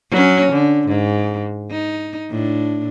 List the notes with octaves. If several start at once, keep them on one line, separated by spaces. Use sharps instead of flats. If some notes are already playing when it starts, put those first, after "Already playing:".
F#3 C#4
D3
G#2
D#4
A2 D4